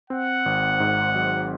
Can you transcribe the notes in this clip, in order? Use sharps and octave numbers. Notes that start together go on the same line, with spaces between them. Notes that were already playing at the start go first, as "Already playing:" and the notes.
C4 F#5
G#1
G#2
F#3